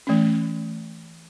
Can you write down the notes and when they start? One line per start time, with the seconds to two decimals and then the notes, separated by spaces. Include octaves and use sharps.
0.07 E3 A3 C#4